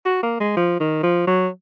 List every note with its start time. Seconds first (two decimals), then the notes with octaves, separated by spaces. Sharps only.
0.05 F#4
0.23 A#3
0.40 G#3
0.57 F3
0.80 D#3
1.03 F3
1.27 F#3